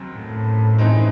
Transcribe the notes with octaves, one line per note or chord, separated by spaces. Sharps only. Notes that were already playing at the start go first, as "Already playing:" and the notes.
Already playing: D#2 C#3 F#3 C4
A2
F#2 E3 G#3 C4 D#4